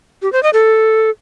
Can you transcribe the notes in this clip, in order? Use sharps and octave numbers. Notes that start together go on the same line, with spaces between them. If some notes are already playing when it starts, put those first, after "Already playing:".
G4
C5
D#5
A4